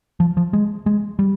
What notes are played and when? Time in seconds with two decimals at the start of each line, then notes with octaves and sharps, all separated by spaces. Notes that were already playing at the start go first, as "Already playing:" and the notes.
0.20 F3
0.37 F3
0.53 G#3
0.86 G#3
1.19 G3